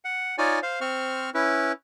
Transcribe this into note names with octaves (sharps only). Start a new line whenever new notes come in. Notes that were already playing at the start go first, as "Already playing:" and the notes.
F#5
D#4 F4 C#5 D5 G#5
C5 F5
C4 C5 C#6 F6
C#4 E4 B4